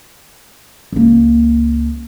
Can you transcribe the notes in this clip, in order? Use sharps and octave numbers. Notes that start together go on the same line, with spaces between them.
C#2 A#3